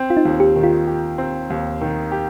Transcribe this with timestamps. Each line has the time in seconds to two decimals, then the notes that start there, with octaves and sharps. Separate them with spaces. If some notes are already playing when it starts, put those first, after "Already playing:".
Already playing: C4
0.10 F4
0.17 D#4
0.25 D#2
0.40 G4
0.56 D#3
0.64 F4
0.87 G4
1.18 C4
1.50 D#2
1.81 D#3
2.12 G4